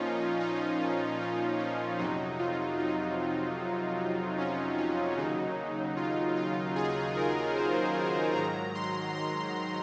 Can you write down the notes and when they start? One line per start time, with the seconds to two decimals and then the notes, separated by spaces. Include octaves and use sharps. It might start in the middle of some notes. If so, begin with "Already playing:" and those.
Already playing: A#2 F3 C#4 D#4 F4
0.40 D#4
0.80 C#4
1.20 D#4
1.59 C#4
1.98 F2 C3 F#3 D#4
2.39 F4
2.78 D#4
4.38 C#4
4.78 C#4
5.17 D#2 C#3 F#3 D#4
5.96 F4
6.36 F4
6.76 G#4
7.16 A#4
7.56 C5
8.35 G#2 D#3 F#3 A#5
8.75 C6
9.15 C6